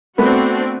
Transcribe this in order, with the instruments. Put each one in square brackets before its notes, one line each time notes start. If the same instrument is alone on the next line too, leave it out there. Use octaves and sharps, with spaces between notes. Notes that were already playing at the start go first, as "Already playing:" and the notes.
[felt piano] A3 B3 B4 [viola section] C4 D4 F#4